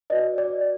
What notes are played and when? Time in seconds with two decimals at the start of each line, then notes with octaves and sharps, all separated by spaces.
0.10 F#4 B4 D5 D#5
0.38 D5